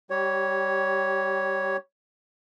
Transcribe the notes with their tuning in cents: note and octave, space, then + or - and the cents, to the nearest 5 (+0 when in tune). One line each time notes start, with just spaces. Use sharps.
G3 +0 G4 -25 C#5 +0